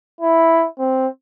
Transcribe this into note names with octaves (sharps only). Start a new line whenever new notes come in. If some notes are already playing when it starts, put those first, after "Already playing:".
E4
C4